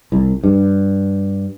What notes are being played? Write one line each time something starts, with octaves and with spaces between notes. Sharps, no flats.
C2
G2